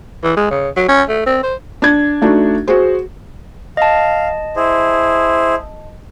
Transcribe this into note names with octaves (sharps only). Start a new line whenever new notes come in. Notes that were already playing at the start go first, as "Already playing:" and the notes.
E3
G#3
C#3
F#3
C#4
A3
C4
C5
D4 G#6
A3 D4 D#4 F#4
F#4 G#4 C5
D#5 F5 A5
E4 G#4 C5